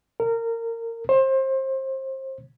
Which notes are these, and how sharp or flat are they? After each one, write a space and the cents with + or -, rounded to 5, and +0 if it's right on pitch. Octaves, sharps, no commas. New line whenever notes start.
A#4 -25
C5 +30